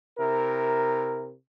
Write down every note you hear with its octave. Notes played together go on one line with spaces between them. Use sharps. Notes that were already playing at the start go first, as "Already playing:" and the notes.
C3 E4 A#4